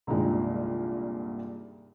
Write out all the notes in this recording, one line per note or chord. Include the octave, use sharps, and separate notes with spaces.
C2 G2 A#2 D#3 G#3